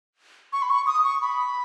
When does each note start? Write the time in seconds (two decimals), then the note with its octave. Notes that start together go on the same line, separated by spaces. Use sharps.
0.53 C#6
0.62 B5
0.70 C#6
0.87 D#6
1.04 C#6
1.22 B5